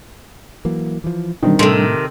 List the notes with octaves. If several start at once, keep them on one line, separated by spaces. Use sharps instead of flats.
E3 F#3 A#3
E3 F3
B2 D#3 E3 G3 C4 D4
A2 C3 D#3 A4 C6